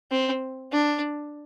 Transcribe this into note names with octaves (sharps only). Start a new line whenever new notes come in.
C4
D4